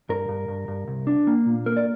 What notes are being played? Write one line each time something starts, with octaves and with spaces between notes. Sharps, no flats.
G2 A#4
G2
G2
G2
C2
D4
A#3
A#2
A#3 A#4
D5